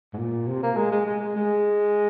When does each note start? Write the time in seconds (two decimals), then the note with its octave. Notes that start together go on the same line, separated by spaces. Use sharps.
0.14 G#2
0.18 A#2
0.48 C3
0.63 A#3
0.77 G#3
0.92 G#3
1.07 G#3
1.36 G#3